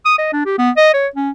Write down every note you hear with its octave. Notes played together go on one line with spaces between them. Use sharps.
D#6
D#5
D4
G4
B3
D#5
C#5
C#4